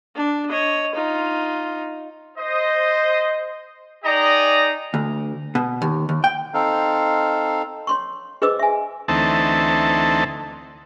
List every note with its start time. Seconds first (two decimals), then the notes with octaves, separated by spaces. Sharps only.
0.16 D4
0.48 C#5 D#5
0.95 D#4 F4
2.38 C5 D#5
4.04 D#4 G#4 D5 D#5 G5 A#5
4.94 D2
5.55 B2
5.82 D#2
6.09 D#2
6.24 G5
6.54 C4 D#4 A4 F5
7.87 C#5 C6 C#6
8.42 G#4 B4 C5 D#5 D6 E6
8.59 E5 G#5
9.08 D2 E3 A3 C4 D#4 A5